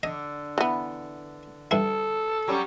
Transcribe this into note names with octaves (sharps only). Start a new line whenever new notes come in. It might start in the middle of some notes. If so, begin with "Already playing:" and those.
D3 D#5
E3 B3
G2 E4 A4
F#3 G3 C#4